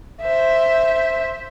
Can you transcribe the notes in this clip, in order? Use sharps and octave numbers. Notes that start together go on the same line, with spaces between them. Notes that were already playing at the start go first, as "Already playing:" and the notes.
C5 E5